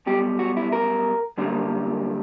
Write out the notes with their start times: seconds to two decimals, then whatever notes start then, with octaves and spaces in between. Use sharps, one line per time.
0.06 B1 B2 G3 G4
0.39 F#4
0.57 E4
0.72 A#4
1.38 F#2 D3 G3 A#3